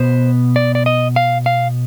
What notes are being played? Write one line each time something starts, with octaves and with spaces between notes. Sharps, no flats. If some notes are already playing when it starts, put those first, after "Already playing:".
Already playing: B2 B3 C5
D5
D5
D#5
F5
F5